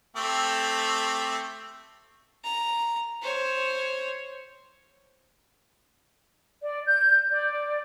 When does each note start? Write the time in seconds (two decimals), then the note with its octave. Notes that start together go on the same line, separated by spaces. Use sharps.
0.16 A3 C4 G4
2.44 A#5
3.22 C5 C#5
6.62 D5
6.86 G6
7.30 D5